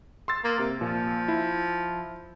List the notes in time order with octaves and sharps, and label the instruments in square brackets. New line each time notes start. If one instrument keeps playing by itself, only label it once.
[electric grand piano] C6 E6 A6
[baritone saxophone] A#3
C3
[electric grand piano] A#2 [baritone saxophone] F3
[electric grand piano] E4